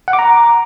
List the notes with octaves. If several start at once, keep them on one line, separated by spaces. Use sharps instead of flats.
F#5
D6
A#5